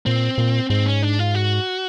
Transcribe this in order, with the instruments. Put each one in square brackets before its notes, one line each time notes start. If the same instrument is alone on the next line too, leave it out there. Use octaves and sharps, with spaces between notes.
[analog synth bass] A#2 [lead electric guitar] C4
[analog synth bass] A#2
[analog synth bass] G#2 [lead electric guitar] C4
[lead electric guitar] C#4
D4
F4
F#4